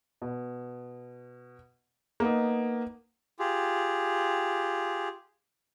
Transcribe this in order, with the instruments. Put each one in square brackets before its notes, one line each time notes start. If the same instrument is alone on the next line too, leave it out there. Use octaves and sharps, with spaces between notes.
[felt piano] B2
A#3 B3 D#4
[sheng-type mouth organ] F4 G4 G#4